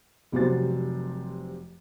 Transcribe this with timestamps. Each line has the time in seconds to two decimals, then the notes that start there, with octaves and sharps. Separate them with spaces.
0.32 F1 C3 F#3 F#4 C5 A6